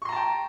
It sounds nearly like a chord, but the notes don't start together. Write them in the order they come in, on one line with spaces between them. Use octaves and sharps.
C#6 C6 A#5 A5 G5